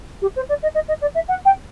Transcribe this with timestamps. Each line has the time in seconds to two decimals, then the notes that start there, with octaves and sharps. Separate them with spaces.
0.21 G4
0.36 C5
0.49 D5
0.62 D#5
0.74 D#5
0.88 D#5
1.01 D5
1.14 E5
1.28 F#5
1.45 G5